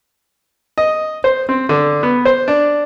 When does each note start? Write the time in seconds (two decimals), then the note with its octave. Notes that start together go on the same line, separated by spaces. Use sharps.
0.78 D#5
1.24 C5
1.49 C4
1.69 D3
2.03 B3
2.25 C5
2.48 D4